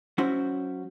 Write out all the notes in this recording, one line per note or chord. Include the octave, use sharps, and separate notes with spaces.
F#3 C#4 E4 F#4 C5